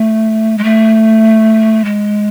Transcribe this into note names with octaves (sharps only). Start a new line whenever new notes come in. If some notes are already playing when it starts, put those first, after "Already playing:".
Already playing: A3
G#3
A3
G#3